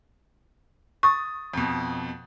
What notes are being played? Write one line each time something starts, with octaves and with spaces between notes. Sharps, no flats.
C#6 D#6 A6
F2 B2